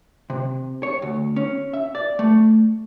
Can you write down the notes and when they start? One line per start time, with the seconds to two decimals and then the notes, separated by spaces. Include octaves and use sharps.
0.30 C3
0.83 C#5
1.02 D2
1.36 C#4
1.73 E5
1.95 D5
2.19 A3